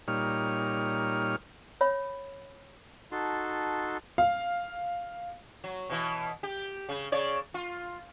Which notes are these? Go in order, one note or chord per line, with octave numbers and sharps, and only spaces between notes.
A#2 G3 D#4 C#5 F6
C#5 E5 B5
D#4 F#4 A4 A5 C6
F5
F#3
B2 E3
G4
C#3
C#3 C#5 D5
F4